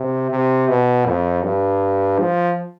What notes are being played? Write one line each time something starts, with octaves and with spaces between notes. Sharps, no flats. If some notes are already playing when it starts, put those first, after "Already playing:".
Already playing: C3
C3
B2
F2
G2
F3